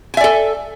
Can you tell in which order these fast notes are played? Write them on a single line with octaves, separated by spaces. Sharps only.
G#5 E5 D5 A4